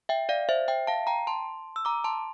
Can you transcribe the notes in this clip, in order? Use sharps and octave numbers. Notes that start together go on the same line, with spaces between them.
E5 G5
D5 F5
C5 E5
E5 G5
F5 A5
G5 A#5
A5 C6
E6
A#5 D6
A5 C6